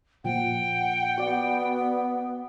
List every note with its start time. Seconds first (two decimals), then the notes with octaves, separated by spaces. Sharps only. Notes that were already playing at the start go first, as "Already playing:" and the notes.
0.24 A#2 F3 F#5 G5
1.18 B3 F#4 D5